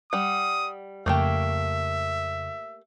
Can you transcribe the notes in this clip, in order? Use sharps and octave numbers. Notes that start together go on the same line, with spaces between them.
G3 F#5 D#6
F2 C#3 A3 A#3 G4 E5